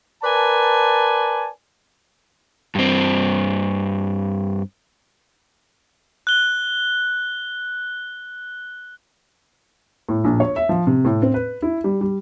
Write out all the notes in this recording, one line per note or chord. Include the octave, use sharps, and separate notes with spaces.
A#4 B4 D5 G#5 A5
G2 C4
F#6 G7
A2
A#1
C#5
E5
F3
C3
A2
C4
B4
E4
G3
G3